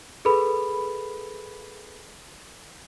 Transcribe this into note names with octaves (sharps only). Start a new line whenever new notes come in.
G#4 A4 B4 B5